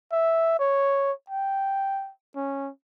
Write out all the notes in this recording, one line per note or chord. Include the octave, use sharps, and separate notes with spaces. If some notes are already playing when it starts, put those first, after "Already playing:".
E5
C#5
G5
C#4